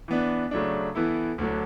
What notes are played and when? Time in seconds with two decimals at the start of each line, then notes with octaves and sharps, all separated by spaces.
0.08 E3 B3 D4
0.51 C#3 F#3 A3 D4
0.95 E3 B3 E4 A4
1.38 D2 D3 F#3